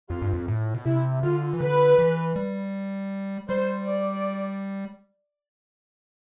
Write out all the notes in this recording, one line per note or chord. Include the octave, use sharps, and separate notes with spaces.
F2 F4
G2
F2
A2
B2
C3 E4
D3 F4
E3
D3 B4
E3
G3
G3 C5
D5